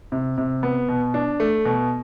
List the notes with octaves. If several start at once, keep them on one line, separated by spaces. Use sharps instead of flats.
C3
C3
B3
B2
D4
A3
B2